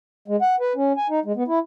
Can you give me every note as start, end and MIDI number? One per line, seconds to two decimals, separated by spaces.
0.28 0.36 56
0.42 0.55 78
0.60 0.73 71
0.76 0.93 61
0.97 1.07 80
1.10 1.20 63
1.25 1.32 56
1.36 1.43 59
1.48 1.59 64